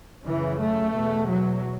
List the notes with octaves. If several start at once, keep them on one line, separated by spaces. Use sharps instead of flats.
F#2 C#3 E3
A3
E2 B2
F#3